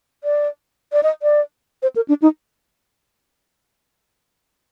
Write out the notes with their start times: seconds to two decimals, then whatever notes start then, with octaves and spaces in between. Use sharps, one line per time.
0.24 D5
0.93 D5
1.03 D#5
1.23 D5
1.82 C5
1.96 A#4
2.08 D4
2.22 D#4